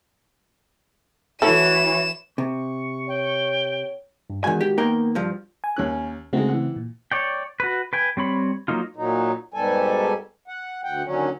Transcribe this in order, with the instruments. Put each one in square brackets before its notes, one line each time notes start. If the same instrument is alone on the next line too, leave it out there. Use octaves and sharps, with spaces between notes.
[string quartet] E3 [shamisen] A3 A4 [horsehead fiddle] F#4 C#5 [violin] E7
[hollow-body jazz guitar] C3 [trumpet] C#6
[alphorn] C#5 [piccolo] G5
[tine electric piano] G2
[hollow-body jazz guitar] E2 G#5 [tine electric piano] D#3 G#3 F#4
[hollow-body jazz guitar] G4
[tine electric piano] D#3 B3 [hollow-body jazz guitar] A#3 A#4 G5
[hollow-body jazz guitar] G2 F3
[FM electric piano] G#5
[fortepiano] D#2 C#4 F#6
[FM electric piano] C#3 A3 C4 [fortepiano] G#3 D#4 F#4
[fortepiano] E3 F#5
[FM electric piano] A#2
[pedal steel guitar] C#5 D5 G5
F#4 B4
B4 G5 G#5
G3 C4 C#5 B5
F#3 A#3 D#4 F4
[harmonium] A#2 F#3 D#4
G#2 B2 G3 A4 G#5
F#5
D2 F#5 G5
D#2 D3 F#3 C#4